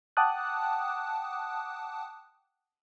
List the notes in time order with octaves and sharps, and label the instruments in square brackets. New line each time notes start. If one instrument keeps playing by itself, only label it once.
[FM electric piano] F#5 G5 A5 D6 D#6 F#6